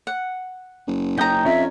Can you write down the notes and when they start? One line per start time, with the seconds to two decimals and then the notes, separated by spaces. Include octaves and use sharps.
0.07 F#5
0.87 F#1
1.18 C#4 D#4 G5 A#5 D#6
1.45 F2 C#4 C#5 E5